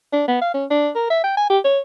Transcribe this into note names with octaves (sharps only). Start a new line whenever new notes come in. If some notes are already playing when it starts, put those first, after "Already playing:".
D4
B3
F5
C#4
D4
A#4
E5
G5
G#5
G4
C#5